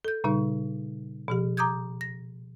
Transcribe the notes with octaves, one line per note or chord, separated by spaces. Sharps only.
A4 G6
A#2 C#3 G3 D#4
B2 F3 G4
A#5 D6 D#6 G6 G#6
A#6